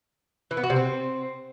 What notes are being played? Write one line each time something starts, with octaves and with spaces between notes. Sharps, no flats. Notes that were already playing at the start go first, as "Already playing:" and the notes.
E3
B3
F#4
C3
C4